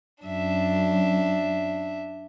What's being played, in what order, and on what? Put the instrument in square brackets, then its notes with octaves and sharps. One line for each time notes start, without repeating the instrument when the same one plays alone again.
[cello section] F#2 [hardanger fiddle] D4 E5